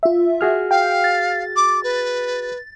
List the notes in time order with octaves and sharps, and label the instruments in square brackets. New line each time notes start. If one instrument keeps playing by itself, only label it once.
[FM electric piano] F4 E5
[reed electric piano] F#4 G#4 F6
[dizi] F5 [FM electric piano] G5
[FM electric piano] A6
[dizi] D6
B4